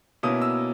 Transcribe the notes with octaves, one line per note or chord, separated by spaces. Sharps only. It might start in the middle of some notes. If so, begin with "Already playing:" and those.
B2 A#3 C#4 E4 D#6
E6